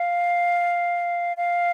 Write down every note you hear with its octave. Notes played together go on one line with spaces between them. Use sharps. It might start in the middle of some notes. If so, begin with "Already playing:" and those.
Already playing: F5
F5